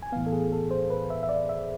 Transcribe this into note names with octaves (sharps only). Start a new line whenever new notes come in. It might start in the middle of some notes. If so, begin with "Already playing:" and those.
G#5
A2 E3 B3 F5
A4
G#4
A4
C5
B4
E5
E5
D5
E5